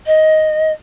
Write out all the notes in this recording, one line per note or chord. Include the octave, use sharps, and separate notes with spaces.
D#5